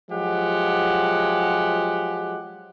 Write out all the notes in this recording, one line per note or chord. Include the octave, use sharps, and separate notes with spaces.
F3 F#3 G#3 G4 F#5